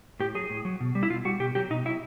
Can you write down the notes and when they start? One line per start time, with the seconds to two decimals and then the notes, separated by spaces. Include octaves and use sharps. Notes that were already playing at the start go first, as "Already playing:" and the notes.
0.20 A2 G4
0.35 F#3 G#4
0.50 A2
0.65 F#3
0.80 B2
0.95 G3
1.03 E4
1.10 B2 F4
1.25 G3 F#4
1.40 B2 G4
1.55 F#3 G4
1.70 B2 D#4
1.85 F#3 E4